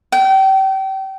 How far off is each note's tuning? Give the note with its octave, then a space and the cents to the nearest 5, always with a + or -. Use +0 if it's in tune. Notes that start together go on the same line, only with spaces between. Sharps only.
G5 -30